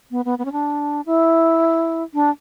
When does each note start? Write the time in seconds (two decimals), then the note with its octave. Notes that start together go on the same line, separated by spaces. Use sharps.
0.11 B3
0.25 B3
0.39 B3
0.45 C#4
0.52 D4
1.06 E4
2.14 D4